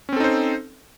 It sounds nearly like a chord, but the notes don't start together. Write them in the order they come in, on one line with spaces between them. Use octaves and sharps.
C#4 C4 A4 D#4 C5